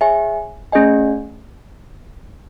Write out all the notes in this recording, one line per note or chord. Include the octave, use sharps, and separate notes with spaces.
G#4 C#5 E5 G#5
A3 C#4 G#4 D#5 G#5